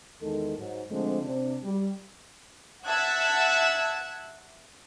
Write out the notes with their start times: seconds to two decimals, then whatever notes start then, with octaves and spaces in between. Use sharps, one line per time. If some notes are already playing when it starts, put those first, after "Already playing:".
0.21 E2 D#3 G#3 A4
0.58 G#2 F#3
0.91 D3 F3 G#3 A3 C4 D4
1.24 C3 D4
1.64 G3
2.86 E5 F#5 A5 E6 F#6 G#6